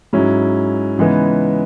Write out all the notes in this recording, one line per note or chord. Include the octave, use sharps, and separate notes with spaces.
G#2 F#3 C#4 E4
C#3 E3 G#3 B3 D#4